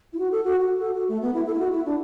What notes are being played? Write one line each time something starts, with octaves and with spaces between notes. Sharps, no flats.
E4
F#4
A4
F#4
F#4
A4
F#4
A3
B3
E4
A4
E4
F#4
E4
D4